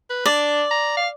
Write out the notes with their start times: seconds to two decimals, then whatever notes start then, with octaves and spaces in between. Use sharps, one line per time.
0.10 B4
0.26 D4 D5
0.71 A#5
0.97 F5